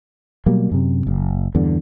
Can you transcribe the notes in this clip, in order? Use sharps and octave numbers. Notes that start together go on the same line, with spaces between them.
B2 F#3 G3 A#3
F#2 C3
F#1
E2 G2 D3